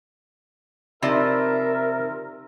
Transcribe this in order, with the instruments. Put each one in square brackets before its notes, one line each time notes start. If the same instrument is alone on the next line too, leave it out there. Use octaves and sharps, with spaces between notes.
[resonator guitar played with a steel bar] C3 F3 [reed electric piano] D#4 D5 B5 [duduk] A#4 [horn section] E5